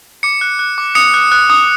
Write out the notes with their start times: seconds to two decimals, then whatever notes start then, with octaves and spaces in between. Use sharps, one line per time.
0.23 D6 C#7
0.41 F#6
0.59 F#6
0.78 D6
0.95 D#6 C#7
1.14 F#6
1.32 F#6
1.50 D#6